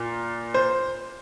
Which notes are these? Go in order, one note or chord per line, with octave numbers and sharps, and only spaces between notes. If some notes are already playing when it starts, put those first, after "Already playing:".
Already playing: A#2
C5